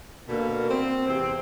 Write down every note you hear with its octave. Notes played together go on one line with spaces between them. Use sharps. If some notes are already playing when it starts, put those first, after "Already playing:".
B2 D3 A#3
C4
E2 C3 C4